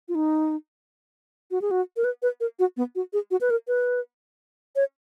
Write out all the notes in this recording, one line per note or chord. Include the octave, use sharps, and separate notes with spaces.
F4
D#4
F#4
G#4
F#4
A#4
B4
B4
A#4
F#4
B3
F#4
G#4
F#4
B4
A#4
B4
C#5